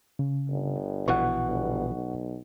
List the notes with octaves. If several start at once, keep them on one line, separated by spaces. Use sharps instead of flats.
C#3
G1
A#1 B2 E3 F#5 C#6
G1
B1